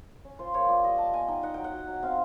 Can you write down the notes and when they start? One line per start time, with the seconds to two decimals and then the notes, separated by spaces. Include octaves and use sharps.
0.25 C#4
0.39 F4 C5
0.54 A#3 C#5
0.69 F4 D5
0.84 G3 D#5
0.98 G3 A5
1.13 B3 G#5
1.28 D#4 G5
1.43 D#4 F#5
1.54 F#3 G5
1.64 F#5
1.73 F#3
1.88 F#3
2.03 C4 F5